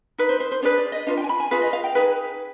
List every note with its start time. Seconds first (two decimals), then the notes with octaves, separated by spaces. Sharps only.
0.18 D#4 B4
0.29 C5
0.40 C5
0.52 C5
0.63 D4 G#4 B4 D5
0.78 D5
0.92 D#5
1.07 D4 F4 B4 F5
1.18 G5
1.24 G#5
1.29 B5
1.40 G#5
1.51 F4 G#4 B4 F5
1.62 D#5
1.73 F5
1.84 G5
1.95 D#4 G#4 B4